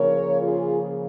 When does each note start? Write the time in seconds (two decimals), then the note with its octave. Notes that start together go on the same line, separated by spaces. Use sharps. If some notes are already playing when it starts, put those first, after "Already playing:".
Already playing: C#3 F3 A#3 A#4 C#5
0.41 F4 G#4